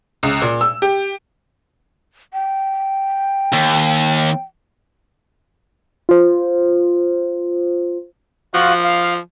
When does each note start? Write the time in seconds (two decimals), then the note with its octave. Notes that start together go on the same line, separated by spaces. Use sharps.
0.23 C#2
0.42 A#2
0.61 E6
0.82 G4
2.33 G5
3.53 D#2
6.09 F4 C5
8.54 F3 F4 F#4 F#6
8.84 F5